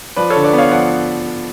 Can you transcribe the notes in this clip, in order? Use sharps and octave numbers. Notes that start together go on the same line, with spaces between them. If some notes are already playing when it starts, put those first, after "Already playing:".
F3 B4 D5
A4 C#5
D3
B4 D5
B3 C#5 F5
F3 D5 F#5